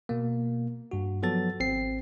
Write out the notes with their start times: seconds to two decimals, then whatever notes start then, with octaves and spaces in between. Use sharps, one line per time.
0.09 B2 A#3
0.91 G2 F#4
1.23 F3 F#3 B3 A4 A6
1.60 G#1 C4 C7